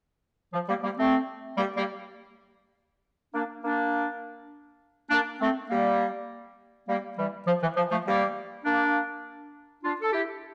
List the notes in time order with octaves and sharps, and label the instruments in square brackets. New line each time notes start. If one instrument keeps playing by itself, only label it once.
[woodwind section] F3
G3 A#3
G3 A#3
A3 C4
G3 A#3
G3 A#3
A#3 D4
A#3 D4
A#3 D4
A3 C4
G3 A#3
G3 A#3
E3 G3
F3
E3
F3
F3 A3
G3 A#3
A#3 D4
D4 F4
A4
E4 G4